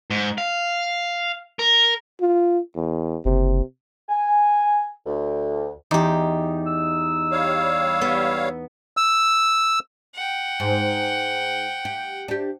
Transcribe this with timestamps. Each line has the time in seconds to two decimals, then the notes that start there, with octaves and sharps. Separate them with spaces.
0.10 G#2
0.38 F5
1.59 A#4
2.21 F4
2.76 E2
3.25 F#1 C3
4.09 G#5
5.06 D2
5.91 E2 D#4 G4
6.67 E6
7.32 G3 C#5 F5
8.01 B3
8.97 E6
10.15 F#5 G5
10.60 G#2
11.85 G4
12.28 D4 G4